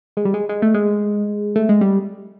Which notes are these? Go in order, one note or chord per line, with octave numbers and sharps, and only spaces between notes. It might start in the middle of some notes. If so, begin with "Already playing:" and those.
G#3
G3
G#3
G#3
A3
G#3
A3
G#3
G3